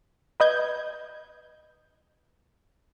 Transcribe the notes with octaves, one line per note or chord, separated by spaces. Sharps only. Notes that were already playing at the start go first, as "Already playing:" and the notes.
B4 D#5 G6 G#6